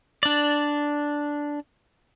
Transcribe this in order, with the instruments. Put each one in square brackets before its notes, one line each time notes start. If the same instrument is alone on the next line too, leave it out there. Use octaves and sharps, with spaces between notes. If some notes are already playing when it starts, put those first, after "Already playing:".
[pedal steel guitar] D4 D5